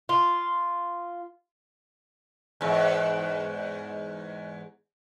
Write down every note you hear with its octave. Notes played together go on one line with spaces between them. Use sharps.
F4
E2 G#2